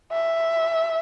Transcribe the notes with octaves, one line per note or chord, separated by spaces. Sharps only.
E5